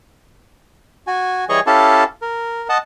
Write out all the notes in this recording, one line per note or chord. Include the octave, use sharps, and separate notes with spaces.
F#4 G#5
E3 G3 G#4 C#5 D#5 C#6
C#4 E4 G4 A4 F5 A5
A#4
D#5 F#5 A5